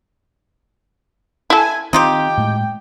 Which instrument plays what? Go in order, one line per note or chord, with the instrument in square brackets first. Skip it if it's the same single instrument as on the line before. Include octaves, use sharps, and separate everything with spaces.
[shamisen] E4 A4 [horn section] G#5
[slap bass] D#3 C4 [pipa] D#4 F4 G4 [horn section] G5
[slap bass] A2 G#3